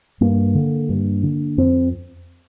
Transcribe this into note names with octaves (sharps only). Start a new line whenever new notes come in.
G2 A#3
D3
G2
D3
F2 C4